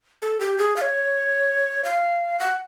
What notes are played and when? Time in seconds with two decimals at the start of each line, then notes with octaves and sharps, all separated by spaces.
0.22 A4
0.40 G4
0.58 G#4
0.76 F5
0.81 C#5
1.85 F5
2.40 F#5